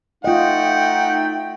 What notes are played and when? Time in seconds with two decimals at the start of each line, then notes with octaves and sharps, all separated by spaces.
0.24 A3 D#4 F4 D#5 F#5 G5